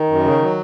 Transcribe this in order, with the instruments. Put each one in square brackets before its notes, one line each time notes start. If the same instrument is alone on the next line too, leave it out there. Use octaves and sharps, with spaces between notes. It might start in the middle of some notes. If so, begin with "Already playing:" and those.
Already playing: [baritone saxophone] D#3
[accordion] F#2
C#3
F#3